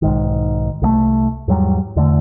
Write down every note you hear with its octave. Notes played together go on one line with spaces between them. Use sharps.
B1 G#2 D#3
C2 F#3 A3
E2 G#2 F#3 G3
E2 D3 A3